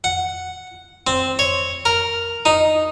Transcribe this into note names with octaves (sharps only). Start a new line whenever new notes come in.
F#5
C4
C#5
A#4
D#4